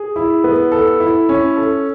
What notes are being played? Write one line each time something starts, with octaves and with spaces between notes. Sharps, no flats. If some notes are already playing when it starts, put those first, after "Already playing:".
Already playing: G#4
E4
B3
A4
E4
C#4
A4